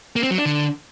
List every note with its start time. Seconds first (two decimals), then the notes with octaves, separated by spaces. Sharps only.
0.16 A#3
0.23 C4
0.31 F#3
0.38 D4
0.45 D3